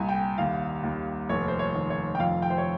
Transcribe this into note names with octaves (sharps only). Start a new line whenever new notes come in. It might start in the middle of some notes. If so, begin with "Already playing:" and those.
Already playing: C2 A#2 G#5
G5
D#2 F5
D#2
F1 C#5
C5
C#5
D#3
C#5
G5
F2 F5
G5
C5
C#5